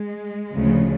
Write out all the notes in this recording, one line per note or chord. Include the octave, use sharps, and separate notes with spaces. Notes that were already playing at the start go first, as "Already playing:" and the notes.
Already playing: G#3
D2 C#3 F3